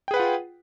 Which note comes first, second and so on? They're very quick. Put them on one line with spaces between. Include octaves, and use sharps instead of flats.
G5 G#4 B4 F#5 F4